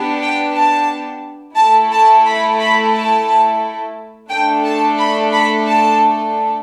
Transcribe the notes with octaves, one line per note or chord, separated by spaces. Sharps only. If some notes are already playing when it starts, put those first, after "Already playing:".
Already playing: B3 D4 G4
G5
A5
A3 E4 A4 A5
A5
B5
B5
A5
A3 D4 A4 G5
A5
B5
B5
A5